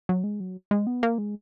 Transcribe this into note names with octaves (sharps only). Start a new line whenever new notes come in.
F#3
G#3
F#3
G#3
B3
A#3
G#3